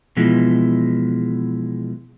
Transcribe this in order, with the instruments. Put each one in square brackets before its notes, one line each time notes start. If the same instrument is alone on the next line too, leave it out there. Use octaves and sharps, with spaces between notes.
[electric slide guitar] B2 E3 F3 G#3